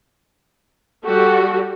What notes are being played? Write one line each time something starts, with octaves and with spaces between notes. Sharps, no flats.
G3 F#4 G4 A4